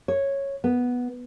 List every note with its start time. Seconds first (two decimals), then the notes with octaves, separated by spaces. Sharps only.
0.08 C#5
0.64 B3